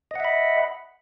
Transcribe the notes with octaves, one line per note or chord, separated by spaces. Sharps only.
D#5 E5 F#5 B5